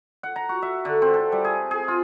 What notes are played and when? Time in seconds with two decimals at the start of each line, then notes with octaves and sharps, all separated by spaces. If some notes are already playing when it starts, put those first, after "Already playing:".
0.23 F#5
0.36 A#5
0.49 F#4
0.62 E5
0.85 D3
1.02 C4
1.14 A4
1.32 G3
1.45 G#4
1.71 G#4
1.88 F4